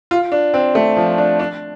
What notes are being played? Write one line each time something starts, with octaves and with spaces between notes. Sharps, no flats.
F4
D4
C4
A3
F3
D4
D4